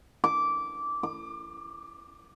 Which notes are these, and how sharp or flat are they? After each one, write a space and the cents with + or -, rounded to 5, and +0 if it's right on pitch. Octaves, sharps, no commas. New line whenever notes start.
D6 -15
D6 +30